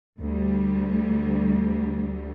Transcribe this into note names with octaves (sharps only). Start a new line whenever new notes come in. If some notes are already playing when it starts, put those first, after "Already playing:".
D2 G3